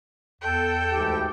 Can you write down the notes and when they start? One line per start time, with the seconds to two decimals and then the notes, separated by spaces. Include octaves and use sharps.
0.42 E2 A4 G5
0.92 D2 G#2 E3 G4